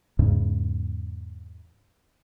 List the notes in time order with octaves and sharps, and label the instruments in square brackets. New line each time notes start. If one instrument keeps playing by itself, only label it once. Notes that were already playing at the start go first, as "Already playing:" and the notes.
[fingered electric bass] E2 G#2 C#3